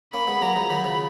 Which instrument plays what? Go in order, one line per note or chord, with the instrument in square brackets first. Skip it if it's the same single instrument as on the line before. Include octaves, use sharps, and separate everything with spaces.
[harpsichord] A#3 C#4 [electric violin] B5
[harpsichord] G#3 B3
[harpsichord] F#3 A#3 [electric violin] A#5
[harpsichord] F3 G#3
[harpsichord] D#3 F#3 [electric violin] B5
[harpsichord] C#3 F3